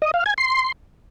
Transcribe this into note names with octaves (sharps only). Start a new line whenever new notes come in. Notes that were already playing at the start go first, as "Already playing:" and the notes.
D#5
F5
G#5
C6